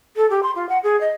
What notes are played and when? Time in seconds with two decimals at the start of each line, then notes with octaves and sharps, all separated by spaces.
0.16 A4
0.30 G4
0.43 C6
0.55 F4
0.69 F#5
0.83 G#4
1.00 D#5